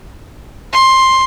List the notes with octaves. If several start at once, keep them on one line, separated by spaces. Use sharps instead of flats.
C6